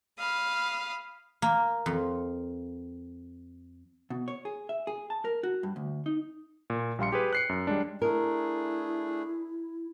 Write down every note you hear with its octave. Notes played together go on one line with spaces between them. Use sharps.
F5 B5 D#6
A#3
F2
B2
C#5
G#4
E5
G#4
A5
A#4
F#4
G2
D2
D#4
A#2
A#1 G3 F5 C6 C#7
G4 G#4 B4
F#6 C7 C#7
F#2
G3 G#3 D4
A3 D4 E4 G#4 A#4